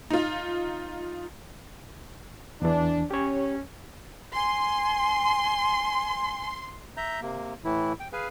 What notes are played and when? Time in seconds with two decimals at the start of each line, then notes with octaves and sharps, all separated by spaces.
0.10 D#4 F4
2.62 E2 E3 D4
3.11 C#4 G4 C#5
4.35 G#5 C6
6.97 E5 A#5 G6
7.22 C3 A#3
7.64 A2 E3 E4
8.00 G5
8.13 G#4 B4 F5 G#5